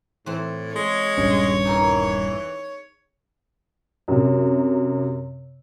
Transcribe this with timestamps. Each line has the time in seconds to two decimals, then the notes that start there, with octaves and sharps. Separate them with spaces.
0.26 A2 E3 C4
0.76 G#3 C#5
1.18 D#1 G2 C#4
1.65 E3 D#4 G#4 A#4
4.08 F#2 C3